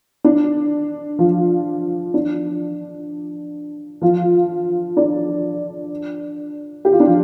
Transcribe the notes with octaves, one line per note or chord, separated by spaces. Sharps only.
D4
F3 F4
D4
F3 F4
D4 D5
G4
F4
D4
F3 F4